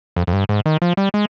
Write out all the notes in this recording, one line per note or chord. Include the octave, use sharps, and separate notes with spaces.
F2
F2
G2
G#2
D#3
F3
G3
G#3